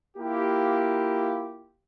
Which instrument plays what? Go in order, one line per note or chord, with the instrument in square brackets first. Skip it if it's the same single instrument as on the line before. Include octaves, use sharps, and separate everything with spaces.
[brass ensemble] A#3 E4 F4 G4